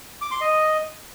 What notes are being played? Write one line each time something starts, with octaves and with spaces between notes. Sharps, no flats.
D6
C6
D#5